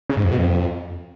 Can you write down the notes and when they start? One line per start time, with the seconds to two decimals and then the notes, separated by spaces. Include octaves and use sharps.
0.09 C#3
0.17 G#2
0.24 F2
0.31 B2
0.39 F2